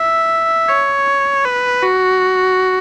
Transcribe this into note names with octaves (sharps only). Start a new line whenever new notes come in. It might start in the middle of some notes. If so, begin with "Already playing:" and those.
Already playing: E5
C#5
B4
F#4